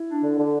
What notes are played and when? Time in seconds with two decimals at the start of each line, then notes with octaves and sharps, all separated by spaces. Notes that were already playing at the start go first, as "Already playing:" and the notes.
Already playing: E4
0.09 D4
0.23 D3
0.38 D3